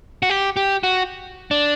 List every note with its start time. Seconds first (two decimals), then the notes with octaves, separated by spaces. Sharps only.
0.23 F#4
0.30 G4
0.57 G4
0.83 F#4
1.51 D4